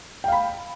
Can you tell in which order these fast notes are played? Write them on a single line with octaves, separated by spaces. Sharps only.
G5 F5 B5